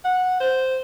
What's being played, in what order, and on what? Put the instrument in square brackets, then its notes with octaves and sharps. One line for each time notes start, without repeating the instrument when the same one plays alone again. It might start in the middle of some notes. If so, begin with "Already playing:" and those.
[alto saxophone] F#5
C5